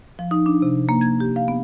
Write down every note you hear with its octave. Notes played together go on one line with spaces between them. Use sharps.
F3
D#4
D4
C3
A#3
G#6
G4
F5
B3